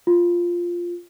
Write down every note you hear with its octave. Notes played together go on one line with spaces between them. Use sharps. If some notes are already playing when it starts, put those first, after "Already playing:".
F4